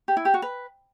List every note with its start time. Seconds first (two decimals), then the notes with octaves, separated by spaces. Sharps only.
0.08 G4
0.17 E4
0.25 G4
0.34 F#4
0.42 B4